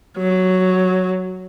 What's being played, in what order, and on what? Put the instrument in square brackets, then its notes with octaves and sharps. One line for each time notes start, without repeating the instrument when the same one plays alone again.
[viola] F#3